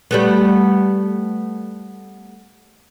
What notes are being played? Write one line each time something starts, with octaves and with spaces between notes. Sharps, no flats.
G3 A3 B3